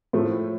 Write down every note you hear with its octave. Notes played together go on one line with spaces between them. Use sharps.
A2 F3 A3